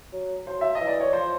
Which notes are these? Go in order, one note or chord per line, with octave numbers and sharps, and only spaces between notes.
F#3
F#3 C5
E5
D#5
E3
D5
C#5
F3 C5